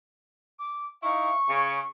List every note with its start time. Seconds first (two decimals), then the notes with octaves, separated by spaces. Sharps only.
0.59 D6
1.02 D#4 E4 F5 C#6
1.49 C#3 C#4